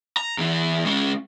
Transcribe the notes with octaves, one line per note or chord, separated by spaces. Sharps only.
A#5
E2 E3
G#3 C#4